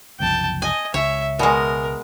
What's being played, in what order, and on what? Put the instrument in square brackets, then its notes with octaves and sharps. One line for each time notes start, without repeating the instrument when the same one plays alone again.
[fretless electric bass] F#1 C2 F3 [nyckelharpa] G5 A5
[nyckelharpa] D#5 [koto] G#5
[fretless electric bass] C#2 [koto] C#5 [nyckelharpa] E5
[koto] B2 G#3 [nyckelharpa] A#4